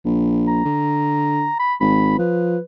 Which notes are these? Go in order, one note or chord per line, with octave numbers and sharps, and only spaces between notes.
A#1
A#5
D3
B5
G#1 B5
F3 B4